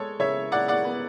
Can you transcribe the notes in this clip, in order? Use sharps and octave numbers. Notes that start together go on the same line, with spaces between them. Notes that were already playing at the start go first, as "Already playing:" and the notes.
Already playing: G#3 A4 C#5
C#3 C#5 E5
C#3 D5 F#5
D5 F#5
B3